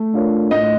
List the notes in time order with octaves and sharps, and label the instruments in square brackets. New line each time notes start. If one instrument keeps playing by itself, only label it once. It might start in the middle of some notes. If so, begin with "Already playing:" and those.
Already playing: [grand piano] A3
D4 F4 A#4 C#5
[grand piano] A2 [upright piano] D#5